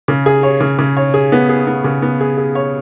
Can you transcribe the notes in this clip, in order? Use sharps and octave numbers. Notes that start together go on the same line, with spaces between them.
C#3
G#4
C#5
C#3
C#3
C#5
G#4
B3
G#4
B3
C#3
B3
G#4
G#4
C#5